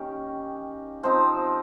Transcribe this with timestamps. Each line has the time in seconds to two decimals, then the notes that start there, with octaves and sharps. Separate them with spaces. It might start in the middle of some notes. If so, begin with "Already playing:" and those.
Already playing: D#3 A#3 C#4 G4
1.03 F3 C4 D#4 C5